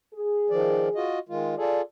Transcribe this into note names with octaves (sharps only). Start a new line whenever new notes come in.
G#4
D#3 F3 D5
F4 F#4 D#5
D#3 G#3 F4
F4 G#4 A4 D5